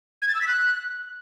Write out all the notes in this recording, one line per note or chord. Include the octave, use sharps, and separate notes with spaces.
G#6
A6
E6
B6
F#6